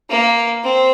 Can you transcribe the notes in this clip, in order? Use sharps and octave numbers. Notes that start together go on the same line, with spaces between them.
A#3
C4